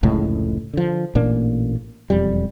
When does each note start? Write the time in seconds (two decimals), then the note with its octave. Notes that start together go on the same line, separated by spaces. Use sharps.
0.03 F1 C#2 A2 G#3
0.74 D3 F3
1.15 A1 A#2 A#3 D4
2.10 E1 F2 G3